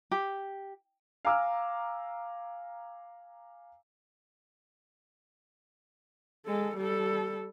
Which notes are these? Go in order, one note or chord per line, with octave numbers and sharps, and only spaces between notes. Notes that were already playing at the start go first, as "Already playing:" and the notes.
G4
F5 G#5 A#5 D6 E6 F6
G#3 A4
G3 A4